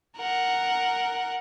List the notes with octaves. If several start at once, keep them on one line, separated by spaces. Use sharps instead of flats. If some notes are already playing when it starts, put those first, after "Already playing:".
A#4 F#5